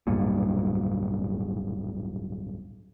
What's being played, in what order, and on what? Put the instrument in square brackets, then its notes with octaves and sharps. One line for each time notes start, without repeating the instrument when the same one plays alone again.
[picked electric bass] D1 B1 G2 A#2